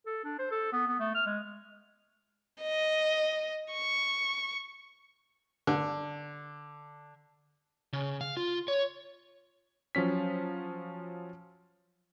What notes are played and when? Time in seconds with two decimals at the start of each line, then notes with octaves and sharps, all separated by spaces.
0.06 A4
0.25 D4
0.39 C5
0.51 A4
0.73 B3
0.87 B3
1.00 A3
1.15 F6
1.26 G#3
2.62 D#5
3.73 C#6
5.67 D3
7.93 C#3
8.21 F5
8.37 F4
8.68 C#5
9.95 F3 F#3 C#4 B6